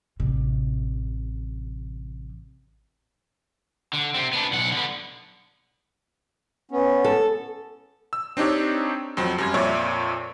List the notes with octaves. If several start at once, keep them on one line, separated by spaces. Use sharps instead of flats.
A1 C3
D3
C3 C4
B3 D4
B1 F#5
D3 B3
B3 C#4
A4
E6
C4 D4 D#4 G4 C#5
F2 F#3 C4
F#2 G3 G#6
F2 A#2 C#5 D5 E5 C#6